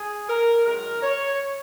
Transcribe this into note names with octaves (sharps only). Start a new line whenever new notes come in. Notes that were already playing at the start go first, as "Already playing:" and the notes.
Already playing: G#4
A#4
F#2 D#3 G#3 A#4
C#5